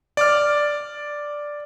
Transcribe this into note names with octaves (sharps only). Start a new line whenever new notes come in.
D5 D6 F6